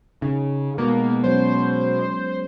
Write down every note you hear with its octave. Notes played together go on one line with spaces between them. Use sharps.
C#3 D#4
B2 G#3 A#3 B3
F#3 C#4 C5